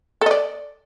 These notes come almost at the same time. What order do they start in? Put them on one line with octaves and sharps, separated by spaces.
A4 D#5 D5